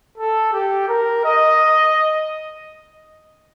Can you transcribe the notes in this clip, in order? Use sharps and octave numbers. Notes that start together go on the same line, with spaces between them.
A4
G4
A#4
D#5